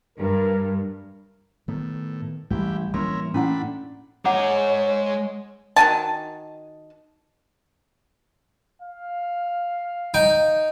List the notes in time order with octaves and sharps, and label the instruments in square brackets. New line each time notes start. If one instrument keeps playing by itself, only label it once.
[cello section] G2 [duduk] A#4
[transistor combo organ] A2 [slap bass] D#3 B3
[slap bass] A1 [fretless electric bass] A2 G3 G#3 [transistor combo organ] E3 G4
[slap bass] E3 A#3 C4 [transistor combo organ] C#4 E4 A#4 [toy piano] C6
[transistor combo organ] A2 D4 B5 [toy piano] C#4 E4 F#5
[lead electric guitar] G#3 A#5 [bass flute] C#5 [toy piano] F#5 D6
[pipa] D#3 F#4 G#5 A5
[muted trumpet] F5
[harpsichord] D#4 G5